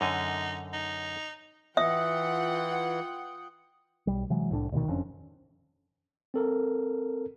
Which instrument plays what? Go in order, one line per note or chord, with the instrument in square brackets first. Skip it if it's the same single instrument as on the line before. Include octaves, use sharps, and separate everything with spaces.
[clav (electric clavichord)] F#2 D3 G#5 [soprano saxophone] D#4
[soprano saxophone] D#4
[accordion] E3 [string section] F4 F#5 G5 [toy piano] E5 [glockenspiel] D#6
[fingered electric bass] B1 G3
C3 E3 F#3 G#3
C2 A2 C#4 D4
D2 B2 D3 D#3
F#1 F2 C#4 D4
[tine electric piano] C4 A4 A#4